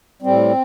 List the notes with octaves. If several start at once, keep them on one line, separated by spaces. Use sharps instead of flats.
A2 G3 C4